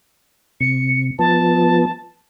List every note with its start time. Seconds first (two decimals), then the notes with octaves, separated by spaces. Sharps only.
0.61 C3 C#7
1.19 F3 B3 A5